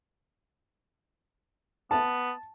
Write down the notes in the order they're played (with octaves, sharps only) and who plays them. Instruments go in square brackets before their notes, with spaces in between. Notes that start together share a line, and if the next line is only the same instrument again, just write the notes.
[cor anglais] B3 [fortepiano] A5